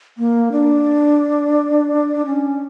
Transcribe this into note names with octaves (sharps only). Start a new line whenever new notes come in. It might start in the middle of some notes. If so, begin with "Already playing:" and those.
A#3
D4
C#4